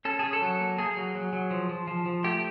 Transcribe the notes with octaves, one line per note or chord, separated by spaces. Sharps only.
C#4 A4
C#4 G#4
A4
F#3
A#3
A#3 G#4
F#3
F#3
F#3
F3
F3
F3
F3
A3 G4